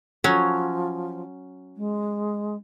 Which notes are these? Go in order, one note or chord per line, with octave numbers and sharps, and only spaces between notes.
F3 F#3 C#4
G#3